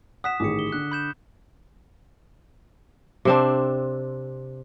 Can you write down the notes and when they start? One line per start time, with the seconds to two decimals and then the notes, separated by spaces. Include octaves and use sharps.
0.24 F#5 D#6 B6 E7
0.40 A1 D#3 G#4 D6 C#7
0.59 G7
0.72 D3 F#6
0.92 B5 G6 E7
3.25 C3 C4 D4